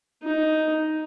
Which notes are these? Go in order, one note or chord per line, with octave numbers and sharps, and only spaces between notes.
D#4